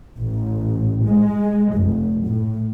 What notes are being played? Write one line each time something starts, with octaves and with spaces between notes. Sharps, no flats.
A1
G#3
F1
A2